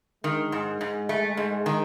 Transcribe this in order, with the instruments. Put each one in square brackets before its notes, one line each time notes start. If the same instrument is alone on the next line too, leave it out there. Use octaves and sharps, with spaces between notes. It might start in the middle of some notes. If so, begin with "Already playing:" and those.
[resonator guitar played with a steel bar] D#3 [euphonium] G#3
[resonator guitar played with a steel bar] G#2
G#2
A3
G#2
D#3